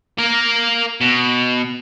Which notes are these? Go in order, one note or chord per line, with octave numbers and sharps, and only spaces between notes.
A#3 A#4
B2